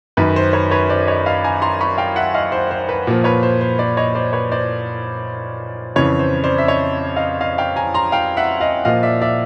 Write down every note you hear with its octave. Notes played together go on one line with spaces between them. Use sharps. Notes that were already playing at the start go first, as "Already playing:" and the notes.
F#2 D#3 B4
C5
B4 C#5
B4 C#5
C5 D5
C#5 D#5
D#5 F5
G#5 A#5
A#5 C6
B5 C#6
F5 G5
E5 F#5
D#5 F5
C5
C5
B4
A#2 F3
B4 C#5
C5
C5
C5 D5
C#5 D#5
C5 D5
B4 C#5
C5 D5
F2 C#3 E3 B4 C#5
C5
C5 D5
E5
C#5 D#5
D#5 F5
D#5 F5
F5 G5
G#5 A#5
A#5 C6
F5 G5
E5 F#5
D#5 F5
A#2 F3 D#5 F5
D5 E5
D5 E5